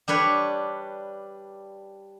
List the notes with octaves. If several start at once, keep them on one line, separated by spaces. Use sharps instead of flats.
G3 D4 B4 C#5